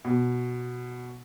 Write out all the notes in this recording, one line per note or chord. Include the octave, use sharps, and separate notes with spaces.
B2